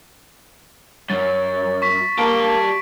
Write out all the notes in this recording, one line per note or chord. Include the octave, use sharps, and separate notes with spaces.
F#2 C#5 A6
C#6 B6
A#3 G4 A5 D7